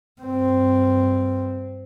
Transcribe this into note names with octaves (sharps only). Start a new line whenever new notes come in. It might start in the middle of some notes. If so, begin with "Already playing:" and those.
G2 C4